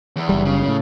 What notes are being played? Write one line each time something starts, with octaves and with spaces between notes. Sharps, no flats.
E2
F#1 G3
C#3
A2